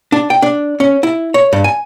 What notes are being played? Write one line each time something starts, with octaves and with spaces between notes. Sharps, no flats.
D4
G5
D4
C#4
E4
C#5
G2
G#5